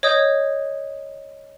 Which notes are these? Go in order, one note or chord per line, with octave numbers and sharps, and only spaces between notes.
C#5 D#5 D#6 G6